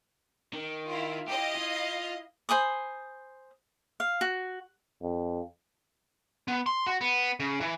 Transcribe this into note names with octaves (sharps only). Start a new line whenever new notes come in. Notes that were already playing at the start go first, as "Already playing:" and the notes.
D#3
E4 F4
E4 G4 D#5 F5
F4
C5 G#5 B5 D#6
F5
F#4
F2
B3
C6
F#4
B3
C#3
E3